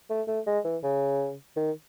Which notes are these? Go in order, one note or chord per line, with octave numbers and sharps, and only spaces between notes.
A3
A3
G#3
E3
C#3
D#3